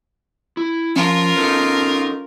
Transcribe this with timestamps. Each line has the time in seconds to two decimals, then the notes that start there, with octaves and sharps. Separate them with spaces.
0.57 E4
0.96 F3 C#4 F4 A#4
1.36 D#4 A4 B4